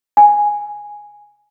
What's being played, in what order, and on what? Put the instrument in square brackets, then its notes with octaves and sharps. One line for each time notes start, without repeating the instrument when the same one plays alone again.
[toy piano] G#5